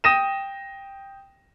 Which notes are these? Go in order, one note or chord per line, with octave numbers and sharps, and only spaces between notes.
G5 D#6 A#6 D#7 E7